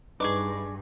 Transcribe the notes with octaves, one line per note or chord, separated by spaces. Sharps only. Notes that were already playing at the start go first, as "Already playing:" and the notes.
G2 D4 D#4 G#4 B4 C#6 D6